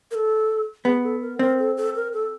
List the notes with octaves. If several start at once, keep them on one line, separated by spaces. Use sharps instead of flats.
A#4
A4
B3 G#4
A4
A#4
C4 A#4
A4
A4
A#4
A4